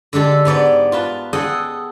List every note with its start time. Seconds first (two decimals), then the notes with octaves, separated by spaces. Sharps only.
0.13 D3 G#3 G4 A4
0.45 G#2 B3 D5 G5
0.92 F4 B4 A5
1.33 G#4 A4 D#5 F#5 G5